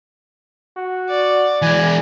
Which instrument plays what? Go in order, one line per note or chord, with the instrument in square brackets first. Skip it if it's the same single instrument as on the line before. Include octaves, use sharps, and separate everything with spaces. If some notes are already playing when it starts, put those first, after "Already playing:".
[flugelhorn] F#4
[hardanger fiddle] D5
[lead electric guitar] E3 G#3 [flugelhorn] G#5